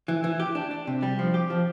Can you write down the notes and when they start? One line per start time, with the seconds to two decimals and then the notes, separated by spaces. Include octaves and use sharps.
0.08 E3
0.24 E3
0.40 G4
0.55 D4
0.71 D4
0.87 C3
1.03 G3
1.19 F3
1.34 G4
1.50 F3